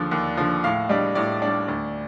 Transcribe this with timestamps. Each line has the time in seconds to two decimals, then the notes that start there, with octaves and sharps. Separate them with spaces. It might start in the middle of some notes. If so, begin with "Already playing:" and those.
Already playing: D#2 D3 F3 D5
0.11 D#2
0.37 D3 F3
0.64 A2 F5
0.89 G3 D4 D#5
1.15 A2 D5
1.42 G3 D4
1.68 D2